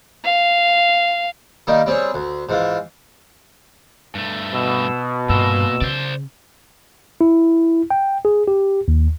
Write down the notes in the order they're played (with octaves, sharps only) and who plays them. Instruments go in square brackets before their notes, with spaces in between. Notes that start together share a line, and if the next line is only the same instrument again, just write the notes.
[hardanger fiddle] F5
[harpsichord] D#3 G3 A#3 D#4
G3 C4 G#4 C#5
D2
G#2 E3 F4
[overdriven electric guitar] G2 A3
[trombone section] B2 [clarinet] E6
[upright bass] G2 [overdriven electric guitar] A#2 A#3 [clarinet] E6
[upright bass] C#3 [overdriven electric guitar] C5 D5
[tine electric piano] E4
G5
G#4
G4
D#2